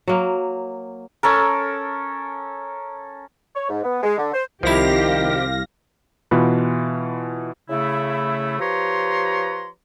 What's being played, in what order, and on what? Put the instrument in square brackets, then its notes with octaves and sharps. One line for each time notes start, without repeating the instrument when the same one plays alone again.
[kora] F#3 A#3
[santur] C#4 A4 A#4
[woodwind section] C#5
G#2
B3
G#3
D3
C5
[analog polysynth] C2 F5 A#6 [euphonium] D#3 [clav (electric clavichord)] F3 E4 [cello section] C4 G4
[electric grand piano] B2 E3 F4 B5 F#6
[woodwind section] C#3 A3 E4
F3 G4 B4 C#5 A#5 C6